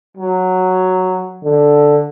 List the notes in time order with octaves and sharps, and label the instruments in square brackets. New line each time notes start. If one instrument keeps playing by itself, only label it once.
[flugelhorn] F#3
[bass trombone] D3